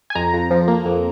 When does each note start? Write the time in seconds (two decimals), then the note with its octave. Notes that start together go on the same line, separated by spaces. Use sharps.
0.10 G#5
0.15 F2 A#5
0.33 F2
0.51 F3
0.68 A#3
0.86 F2